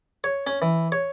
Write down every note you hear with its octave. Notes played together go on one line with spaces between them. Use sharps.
C#5
C#4
E3
C#5